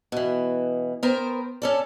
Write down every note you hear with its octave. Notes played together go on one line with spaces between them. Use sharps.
B2 E3
B3 A#4 C5 G5
C#4 A4 D5